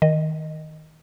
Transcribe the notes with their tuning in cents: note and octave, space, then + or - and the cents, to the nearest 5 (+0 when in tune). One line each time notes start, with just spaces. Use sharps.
D#3 +15 D#5 -10